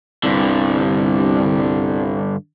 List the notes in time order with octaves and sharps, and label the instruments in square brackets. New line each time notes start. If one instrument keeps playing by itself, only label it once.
[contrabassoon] C2 [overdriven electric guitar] G2 D3